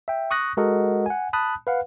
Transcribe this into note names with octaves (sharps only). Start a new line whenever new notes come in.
E5 G5
C#6 D#6 F#6 A#6
G#3 F#4 A4 A#4 D#5 F#5
F#5 G#5
A5 B5 D#6 F#6
B4 F5 F#5